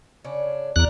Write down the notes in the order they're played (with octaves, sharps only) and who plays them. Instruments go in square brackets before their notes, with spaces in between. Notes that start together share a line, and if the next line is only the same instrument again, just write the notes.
[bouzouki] C#3 D4 C#5
[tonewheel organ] E2 F#6 [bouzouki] D4 A#4